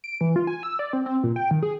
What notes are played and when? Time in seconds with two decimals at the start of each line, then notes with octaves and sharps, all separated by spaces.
0.04 D7
0.21 E3
0.36 F4
0.47 G#5
0.63 E6
0.79 D5
0.93 C4
1.06 C4
1.23 A#2
1.36 G5
1.51 D#3
1.62 G#4